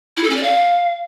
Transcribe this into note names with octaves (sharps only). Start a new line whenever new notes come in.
E4
A4
C#4
D5
F5